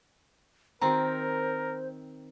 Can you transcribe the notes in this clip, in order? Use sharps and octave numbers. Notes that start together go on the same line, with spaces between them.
D#3 C4 F#4 A#4 C5 A#5